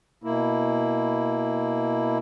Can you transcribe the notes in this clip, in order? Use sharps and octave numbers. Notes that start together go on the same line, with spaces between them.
B2 A#3 E4